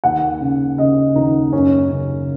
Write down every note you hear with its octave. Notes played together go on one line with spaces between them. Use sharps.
D#2 F#5
C#3
C#3 D#5
D#2 D#4
F#2 C#4
C#3